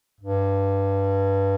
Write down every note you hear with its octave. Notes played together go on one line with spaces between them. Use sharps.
G2